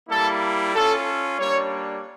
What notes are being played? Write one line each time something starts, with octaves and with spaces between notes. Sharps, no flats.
G3 A#3 E4 A4
C#4 F4 A4
G3 A#3 D4 C#5